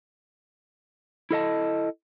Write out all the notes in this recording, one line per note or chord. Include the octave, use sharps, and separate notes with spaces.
E4 A4 D#5 A5